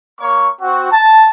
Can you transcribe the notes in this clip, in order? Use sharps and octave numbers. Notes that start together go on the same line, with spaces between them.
A#3 C#5 C#6
C4 F#4
A5